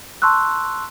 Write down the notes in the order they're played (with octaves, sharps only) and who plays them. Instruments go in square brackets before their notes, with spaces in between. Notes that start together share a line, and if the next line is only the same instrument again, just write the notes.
[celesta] A5 C6 C#6 E6 F#6